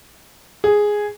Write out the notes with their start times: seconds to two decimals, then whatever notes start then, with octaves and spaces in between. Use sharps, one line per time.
0.64 G#4